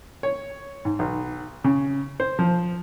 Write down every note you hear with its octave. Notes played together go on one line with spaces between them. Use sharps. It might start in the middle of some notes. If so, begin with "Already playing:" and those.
C#5
G#2
B1
C#3
C5
F3